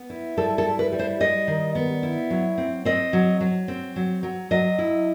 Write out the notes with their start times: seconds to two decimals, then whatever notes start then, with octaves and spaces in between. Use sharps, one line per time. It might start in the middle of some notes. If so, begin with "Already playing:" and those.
Already playing: B3
0.10 E4
0.37 G3 A4
0.58 A4
0.65 E4
0.79 B4
0.92 G3
0.99 C5
1.20 G3 D#5
1.48 D#3
1.75 B3
2.03 E4
2.30 F#3
2.58 C4
2.85 C4 D#5
3.13 F#3
3.41 F#3
3.68 C4
3.96 F#3
4.23 F#3
4.51 F#3 D#5
4.78 E4